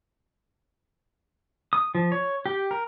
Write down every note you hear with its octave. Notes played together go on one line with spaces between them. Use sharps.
D#6
F3
C#5
G4
A#4